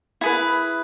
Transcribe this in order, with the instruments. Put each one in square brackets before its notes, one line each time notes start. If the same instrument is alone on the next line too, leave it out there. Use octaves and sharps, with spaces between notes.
[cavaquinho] E4 G#4 B4